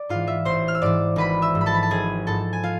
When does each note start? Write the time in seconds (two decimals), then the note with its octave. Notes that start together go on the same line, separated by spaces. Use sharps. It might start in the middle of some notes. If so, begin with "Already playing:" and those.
Already playing: D5
0.09 G#2 E3 F4 F5
0.27 E5
0.45 A1 C5 C6
0.68 F6
0.75 E6
0.82 G#2 E3 D5 D6
1.16 G#1 B4 B5
1.42 E5 E6
1.55 G#2 F3
1.61 B5
1.66 A4 A5
1.75 B5
1.83 A5
1.91 G#1 G#4 G#5
2.27 G#2 F3 A4 A5
2.53 G#5
2.63 F4 F5